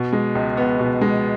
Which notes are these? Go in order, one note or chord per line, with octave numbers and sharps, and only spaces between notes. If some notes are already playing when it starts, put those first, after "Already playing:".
Already playing: B2
G#3
C#2
B3
B2
G#3